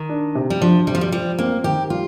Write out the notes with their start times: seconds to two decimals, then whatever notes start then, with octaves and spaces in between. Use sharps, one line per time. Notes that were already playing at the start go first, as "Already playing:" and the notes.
Already playing: D#3
0.09 D4
0.35 C3
0.50 G3
0.61 F3 D4
0.87 C3 G3
0.95 F3
1.01 G3
1.12 F3 G3
1.39 A#3 C4
1.64 D#3 G4
1.90 G3 F4